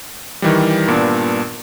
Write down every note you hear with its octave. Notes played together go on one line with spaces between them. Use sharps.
D#3 E3 G3
G2 A#2 B3 D4